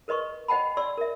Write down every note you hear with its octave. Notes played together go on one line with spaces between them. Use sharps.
A#4 B4 D#5 C6 C#6
C5 D#5 F#5 G5 A5 B5
D5 C6 E6
A#4 E5